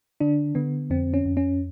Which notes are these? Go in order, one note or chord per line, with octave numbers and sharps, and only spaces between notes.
D3 D4
D3 B3
F2 C4
C#4
F2
C#4